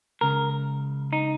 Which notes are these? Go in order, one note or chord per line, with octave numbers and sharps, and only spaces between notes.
C#2 C#3 A#4
D#4